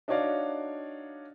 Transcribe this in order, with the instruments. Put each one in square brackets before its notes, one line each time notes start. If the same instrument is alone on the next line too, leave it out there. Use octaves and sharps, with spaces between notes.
[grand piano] D4 D#4 F#4 C#5 D5 F5